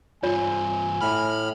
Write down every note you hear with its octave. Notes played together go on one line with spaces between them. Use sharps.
G2 C4 F4 C#5 G#5
A2 B5 F6